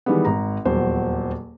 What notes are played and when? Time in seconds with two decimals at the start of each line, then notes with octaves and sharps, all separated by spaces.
0.06 D#3 E3 G3 G#3 B3
0.25 G#1 A#5
0.65 D#1 E2 F#3 C5